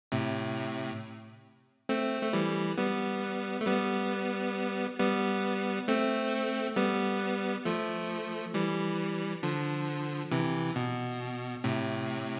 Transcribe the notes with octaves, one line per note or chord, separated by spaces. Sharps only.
A2 C3
A3 C4
A3
E3 G3
G3 B3
A3
G3 B3
G3 B3
A3 C4
G3 B3
F3 A3
E3 G3
D3 F3
C3 E3
B2
A2 C3